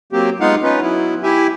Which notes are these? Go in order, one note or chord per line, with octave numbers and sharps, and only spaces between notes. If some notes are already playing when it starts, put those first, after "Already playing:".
F#3 A#3 C4 G4
G#3 B3 D#4 F4 F5 F#5
C#4 D#4 F4 B4
F#3 B3 E4
E4 G4 E5 G#5